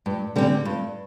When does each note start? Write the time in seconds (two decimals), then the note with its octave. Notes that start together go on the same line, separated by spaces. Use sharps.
0.06 G2
0.36 D3 G3 C4
0.65 G2